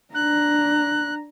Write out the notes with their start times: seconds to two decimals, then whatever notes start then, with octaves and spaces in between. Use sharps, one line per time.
0.14 D4 A#5 F#6